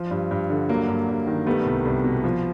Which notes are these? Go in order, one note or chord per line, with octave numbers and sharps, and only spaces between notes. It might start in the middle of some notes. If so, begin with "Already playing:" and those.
Already playing: F3
G2
G2
D3
F#3 A#3
G2
G2
D#3
G3 A3 B3
C2
C2
B2
F3